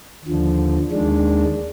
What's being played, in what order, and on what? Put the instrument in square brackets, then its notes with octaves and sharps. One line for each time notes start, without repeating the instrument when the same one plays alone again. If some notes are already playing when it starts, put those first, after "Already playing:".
[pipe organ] D#2 D3 F3
D#2 D#3 G#3 D4